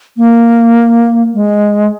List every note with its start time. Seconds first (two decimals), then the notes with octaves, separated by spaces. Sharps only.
0.17 A#3
1.34 G#3